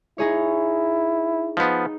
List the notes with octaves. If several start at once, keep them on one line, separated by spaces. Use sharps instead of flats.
D#4 E4 G#4 C#5
F3 B3 D#4